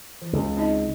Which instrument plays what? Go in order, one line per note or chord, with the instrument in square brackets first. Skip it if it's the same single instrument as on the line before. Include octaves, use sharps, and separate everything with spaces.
[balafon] E3
[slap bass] C#2
[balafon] C4 D#4 D#5